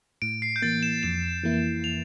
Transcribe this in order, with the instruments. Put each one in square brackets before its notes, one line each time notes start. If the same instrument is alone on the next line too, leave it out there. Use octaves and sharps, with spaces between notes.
[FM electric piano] A2 [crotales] D7
[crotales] C7
G6
[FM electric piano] E3 A#3 [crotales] A6
[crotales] E7
[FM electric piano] F2 [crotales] E7
[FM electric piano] E3 A#3 E4
[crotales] F7